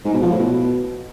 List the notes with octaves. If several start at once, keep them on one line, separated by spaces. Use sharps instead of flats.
G#2
B2
F3
A2
B2